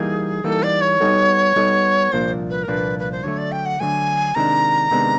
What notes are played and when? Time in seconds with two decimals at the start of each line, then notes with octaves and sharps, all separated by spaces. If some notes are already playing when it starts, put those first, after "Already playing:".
Already playing: E3 G3 A#3 D#4 G#4
0.44 E3 G3 A#3 D#4 A4
0.63 D5
0.81 C#5
1.00 G3 B3 D#4 F#4 A4
1.56 G3 B3 D#4 F#4 A4
2.12 C2 A#2 F3 A#3 D4 C5
2.50 B4
2.63 A#4
2.68 C2 A#2 F3 A#3 D4 B4
2.99 B4
3.12 C5
3.23 D3 F#3 A3 C#5
3.38 D5
3.52 G5
3.66 F#5
3.80 D3 F#3 A3 G#5
4.35 C3 D#3 G#3 B3 D4 A#5
4.91 C3 D#3 G#3 B3 D4